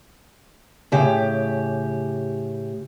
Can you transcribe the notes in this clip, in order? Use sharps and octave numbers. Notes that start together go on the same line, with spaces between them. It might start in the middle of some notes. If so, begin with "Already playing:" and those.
A2 C#3 G4